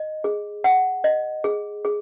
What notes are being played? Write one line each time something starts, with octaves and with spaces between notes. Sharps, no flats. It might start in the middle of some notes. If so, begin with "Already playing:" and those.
Already playing: D#5
G#4
F#5
D#5
G#4
G#4